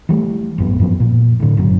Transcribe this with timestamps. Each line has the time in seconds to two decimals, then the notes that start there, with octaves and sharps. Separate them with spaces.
0.09 E3 G3 A3
0.58 A1 F#2 B3
0.80 F#2 F3 B3
1.00 A#2
1.40 A2 D3
1.57 G1 F#2 F#3